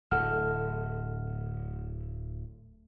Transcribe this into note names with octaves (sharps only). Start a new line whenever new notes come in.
D1 A3 F#5 F6